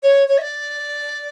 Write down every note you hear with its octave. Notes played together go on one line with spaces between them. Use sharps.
C#5
C#5
E5
D5